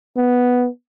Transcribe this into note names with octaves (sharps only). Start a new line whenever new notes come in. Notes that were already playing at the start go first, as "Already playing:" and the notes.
B3